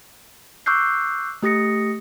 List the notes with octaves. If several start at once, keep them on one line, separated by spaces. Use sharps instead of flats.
C#6 D6 E6 F#6 G6 C7
A3 G4 D#6 A#6 C#7